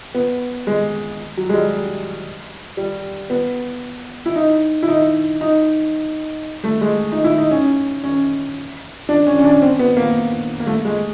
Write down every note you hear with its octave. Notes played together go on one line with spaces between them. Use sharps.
B3
G#3
F#3
G#3
G3
G3
B3
E4
D#4
E4
D#4
D#4
A3
G#3
D#4
E4
D#4
C#4
C#4
D4
C#4
C#4
D4
C4
B3
A#3
A#3
A3
G#3